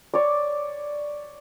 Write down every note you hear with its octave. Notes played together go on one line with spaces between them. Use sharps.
C#5 D5